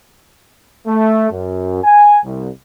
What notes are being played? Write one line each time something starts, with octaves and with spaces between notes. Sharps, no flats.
A3
F#2
G#5
C2